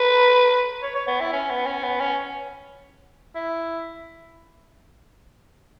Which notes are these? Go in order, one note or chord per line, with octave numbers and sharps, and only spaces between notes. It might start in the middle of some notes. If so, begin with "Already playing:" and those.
Already playing: B4
C#5
C#5
B3
E4
C#4
B3
C#4
B3
C#4
E4